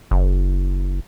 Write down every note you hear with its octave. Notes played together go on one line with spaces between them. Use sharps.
F#1